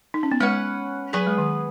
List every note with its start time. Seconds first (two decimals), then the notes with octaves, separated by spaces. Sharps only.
0.14 D#4
0.23 C#4
0.32 B3
0.40 G#3 C#4 B4 F#5
1.13 F#3 B3 G#4 B4
1.27 G#3
1.38 D#3